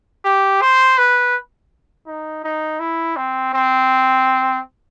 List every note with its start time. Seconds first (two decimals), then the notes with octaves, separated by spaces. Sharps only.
0.25 G4
0.61 C5
0.98 B4
2.07 D#4
2.44 D#4
2.80 E4
3.17 C4
3.54 C4